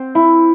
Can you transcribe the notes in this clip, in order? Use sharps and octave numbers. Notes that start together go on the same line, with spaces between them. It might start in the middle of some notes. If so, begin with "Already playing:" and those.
Already playing: C4
E4